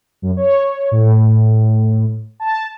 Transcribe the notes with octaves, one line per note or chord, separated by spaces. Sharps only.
F#2
C#5
A2
A5